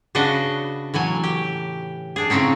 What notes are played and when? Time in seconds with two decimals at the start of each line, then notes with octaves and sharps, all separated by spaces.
0.15 C#3 D4 F#4 B4 D#5
0.94 A2 E3 F#3 G#5
1.24 G4
2.16 D4 G#4
2.30 A2 C#3 C4 C#4 D#4